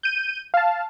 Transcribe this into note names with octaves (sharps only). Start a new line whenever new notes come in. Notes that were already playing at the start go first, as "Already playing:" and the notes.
G6 D#7
F5 A5